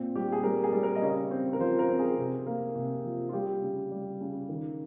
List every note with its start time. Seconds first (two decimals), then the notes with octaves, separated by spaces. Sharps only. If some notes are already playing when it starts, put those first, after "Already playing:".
Already playing: A#2 C4
0.15 G3 G4
0.32 G#4
0.43 G3 A#4
0.64 G#4
0.72 G3
0.83 A#4
0.95 D#5
1.02 C#3 C#5
1.31 C4
1.53 A#4
1.59 F3 C5
1.79 A#4
1.89 C4
1.99 G#4
2.18 C3
2.46 A#3
2.75 C3
3.04 F3
3.29 F4
3.33 G3 G4
3.62 C#3
3.91 G3
4.20 C#3
4.49 D#3